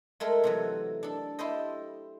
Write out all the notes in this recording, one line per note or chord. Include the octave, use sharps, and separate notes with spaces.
G#3 A3 A4 A#4
C3 E3 F#3
D4 A4
E4 G4 A4 C5 D#5